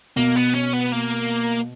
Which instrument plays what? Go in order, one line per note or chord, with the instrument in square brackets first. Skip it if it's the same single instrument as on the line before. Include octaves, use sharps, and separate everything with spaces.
[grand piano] B2 [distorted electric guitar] A#3
[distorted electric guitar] B3
C#4
B3
A#3